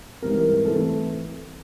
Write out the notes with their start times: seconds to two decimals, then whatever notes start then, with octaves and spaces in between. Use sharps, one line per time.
0.22 G#2 E3 G3 C4 A#4
0.65 E3 A3 C4 E4 A4